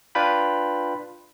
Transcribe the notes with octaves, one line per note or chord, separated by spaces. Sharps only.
D4 F4 B4 G5 B5